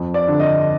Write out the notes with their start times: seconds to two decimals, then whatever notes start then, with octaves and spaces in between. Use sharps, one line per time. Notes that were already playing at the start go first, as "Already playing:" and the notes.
Already playing: F2
0.14 D5
0.28 D3
0.40 D#5